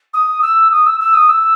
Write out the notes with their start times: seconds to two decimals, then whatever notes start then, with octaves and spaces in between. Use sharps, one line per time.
0.14 D#6
0.42 E6
0.72 D#6
0.86 E6
1.00 E6
1.14 D#6
1.29 E6